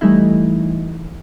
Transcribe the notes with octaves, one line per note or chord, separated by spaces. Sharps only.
E3 G3 A3 D#4 E4